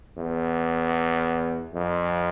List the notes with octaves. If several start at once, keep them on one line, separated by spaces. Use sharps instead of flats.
E2
F2